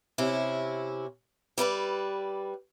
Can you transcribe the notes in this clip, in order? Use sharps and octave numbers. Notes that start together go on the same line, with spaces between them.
C3 C#4 E4
G3 E4 B4 D5